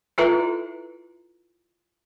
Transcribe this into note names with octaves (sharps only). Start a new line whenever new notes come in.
E4 F4 A4 B4 E5 A#5